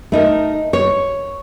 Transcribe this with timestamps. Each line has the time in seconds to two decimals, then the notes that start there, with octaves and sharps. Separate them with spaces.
0.12 A3 D#4 A#4
0.73 C#5